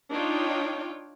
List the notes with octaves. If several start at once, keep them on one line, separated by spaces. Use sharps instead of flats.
D4 D#4 F4 C#5 G5